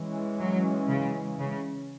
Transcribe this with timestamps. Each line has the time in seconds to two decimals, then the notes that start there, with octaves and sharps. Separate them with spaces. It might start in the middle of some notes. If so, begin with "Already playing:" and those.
Already playing: E3 G#3 C#4
0.39 F#3
0.89 C#3
1.39 C#3